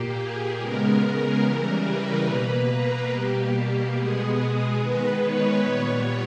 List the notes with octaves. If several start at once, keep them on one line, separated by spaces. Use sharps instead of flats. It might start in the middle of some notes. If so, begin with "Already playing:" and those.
Already playing: A#2 A#3 G4
G#4
C#3 G#3 B3 A#4
C#3 E3 G3
B4
B2 A#3
A#4
B2 G3 A#3 G4
B2 G#3 B3 G#4
D#3 G#3 B3 B4
C#5
A#2 G3 B3